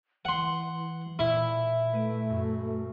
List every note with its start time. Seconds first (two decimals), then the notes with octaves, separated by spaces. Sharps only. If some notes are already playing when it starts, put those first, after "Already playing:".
0.25 E3 F#5 C6
1.19 A#2 E4
1.93 A3 B4 D7 D#7
2.30 F#2